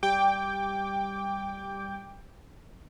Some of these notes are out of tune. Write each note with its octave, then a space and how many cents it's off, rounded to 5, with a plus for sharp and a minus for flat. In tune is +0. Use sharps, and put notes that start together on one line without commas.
G3 +0 G5 +10 D6 -10